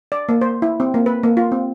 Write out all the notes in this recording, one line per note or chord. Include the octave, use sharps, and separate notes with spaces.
D5
A#3
C5
E4
C4
A#3
B4
A#3
F4
C4